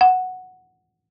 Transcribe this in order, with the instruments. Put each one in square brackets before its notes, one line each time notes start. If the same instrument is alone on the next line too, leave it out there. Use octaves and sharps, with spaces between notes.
[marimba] F#5